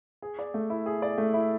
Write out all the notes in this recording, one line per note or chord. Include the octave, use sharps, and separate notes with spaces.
G#4
D5
A3
E4
G#4
D5
A3
E4